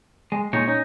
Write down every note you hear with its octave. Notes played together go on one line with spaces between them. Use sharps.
G#3
A#2 G#3 D#4 C#5
C#4 D#4